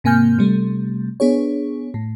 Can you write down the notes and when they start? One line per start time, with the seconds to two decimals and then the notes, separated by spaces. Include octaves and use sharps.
0.04 G#2 C3 A#3 G#5 F6 G6
0.39 C3 G3 A3
1.20 B3 D4 G#4 C#5
1.94 A2